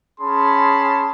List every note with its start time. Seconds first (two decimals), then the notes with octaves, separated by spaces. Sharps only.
0.21 C#4 G#4 A5 B5 C6